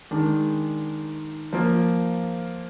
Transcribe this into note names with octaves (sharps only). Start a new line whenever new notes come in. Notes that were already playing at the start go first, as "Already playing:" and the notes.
D#3 G#3 D4
F3 A#3 F4